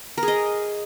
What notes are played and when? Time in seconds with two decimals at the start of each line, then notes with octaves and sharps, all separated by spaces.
0.18 A#4
0.23 G#4
0.28 D#5